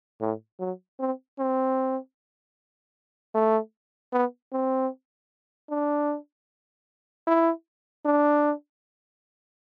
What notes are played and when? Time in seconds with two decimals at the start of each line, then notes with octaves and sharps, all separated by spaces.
0.21 A2
0.60 F#3
1.00 C4
1.39 C4
3.35 A3
4.13 B3
4.53 C4
5.70 D4
7.27 E4
8.06 D4